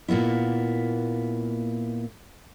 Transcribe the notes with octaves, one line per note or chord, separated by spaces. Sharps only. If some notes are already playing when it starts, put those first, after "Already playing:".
A#2 A#3 B3 E4